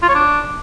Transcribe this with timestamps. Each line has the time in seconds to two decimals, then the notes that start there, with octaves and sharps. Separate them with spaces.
0.03 F4
0.09 C#5
0.15 D4